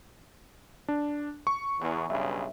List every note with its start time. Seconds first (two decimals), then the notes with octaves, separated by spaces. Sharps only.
0.88 D4
1.47 C#6
1.80 E2
2.10 B1 G2 C#3 E5